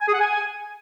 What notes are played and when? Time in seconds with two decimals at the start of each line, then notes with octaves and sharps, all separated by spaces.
0.01 G#5
0.08 G#4
0.14 F#5
0.20 G#5